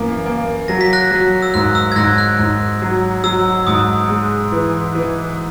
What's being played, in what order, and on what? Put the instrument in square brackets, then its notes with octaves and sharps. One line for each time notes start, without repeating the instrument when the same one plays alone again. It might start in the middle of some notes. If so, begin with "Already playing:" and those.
Already playing: [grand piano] F#2 E3 A#3
A#3
[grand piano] F#3 [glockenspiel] A#6
[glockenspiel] B6
F#6 A#6
[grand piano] F#3
[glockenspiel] E6
[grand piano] G#2 [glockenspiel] F#6
[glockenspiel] E6
G#6
[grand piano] G#2 [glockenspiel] F#6 A#6
[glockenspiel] F#6
[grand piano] G#2
F#3
[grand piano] F#3 [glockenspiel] E6
[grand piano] G#2 [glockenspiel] D#6
[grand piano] G#3
E3
E3